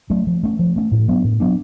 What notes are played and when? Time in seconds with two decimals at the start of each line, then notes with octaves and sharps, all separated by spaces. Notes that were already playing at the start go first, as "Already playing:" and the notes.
0.10 F#3 A3 C#4
0.27 F3
0.43 A3 C#4
0.59 F3
0.76 A3 C#4
0.92 A2
1.08 F#3 B3 D4
1.24 A2
1.40 F#3 B3 D4